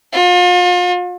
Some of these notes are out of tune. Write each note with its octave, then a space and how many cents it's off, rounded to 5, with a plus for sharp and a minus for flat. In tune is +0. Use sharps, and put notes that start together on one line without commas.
F4 +40